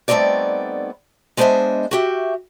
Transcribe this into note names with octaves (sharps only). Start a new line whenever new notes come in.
G3 A3 B3 C4 D#4 D5
G#3 B3 D4 C5 D#5 E5
F#4 G4 E5